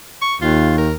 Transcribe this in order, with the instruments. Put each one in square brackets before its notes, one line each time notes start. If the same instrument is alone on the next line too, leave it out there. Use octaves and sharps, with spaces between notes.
[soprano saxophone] C#6
[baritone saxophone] D#2 [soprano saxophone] F4
[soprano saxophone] A#4